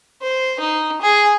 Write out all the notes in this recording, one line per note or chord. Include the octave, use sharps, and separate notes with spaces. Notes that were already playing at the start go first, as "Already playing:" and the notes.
C5
D#4
G#4